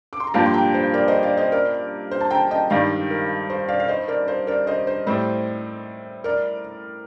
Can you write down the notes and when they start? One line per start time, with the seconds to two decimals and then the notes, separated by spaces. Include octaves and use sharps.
0.13 D6
0.20 C6
0.27 A#5
0.34 G2 F3 A#3 D4 G4 F5 A5
0.46 C6
0.53 G5 A#5
0.74 C5
0.93 A#4 D5
1.08 C5 D#5
1.23 D5 F5
1.37 C5 D#5
1.52 A#4 D5
2.11 C5
2.21 A5
2.30 G5 A#5
2.51 D#5 G5
2.70 G2 D#3 G3 D5 F5
3.10 A#4
3.50 C5
3.68 D5 F5
3.80 F5
3.88 C5 D#5
4.08 A#4 D5
4.28 C5
4.47 A#4 D5
4.67 C5 D#5
4.87 C5
5.07 A2 G3 C4 C5
6.24 A#4 D5